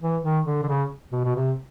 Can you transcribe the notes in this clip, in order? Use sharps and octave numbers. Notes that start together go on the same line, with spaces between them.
E3
D#3
D3
D3
C#3
B2
B2
C3